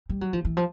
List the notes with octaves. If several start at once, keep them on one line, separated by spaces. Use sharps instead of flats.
G3
F#3
F3
E3
F3